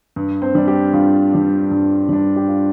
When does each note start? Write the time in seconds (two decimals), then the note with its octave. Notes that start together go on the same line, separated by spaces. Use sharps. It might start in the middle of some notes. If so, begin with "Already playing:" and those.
0.16 G2
0.42 C4 C5
0.55 G3 D4
0.68 G4
0.93 G2 F4
1.33 G3 D4
1.71 G2
2.09 G3 D4
2.36 G4
2.48 F4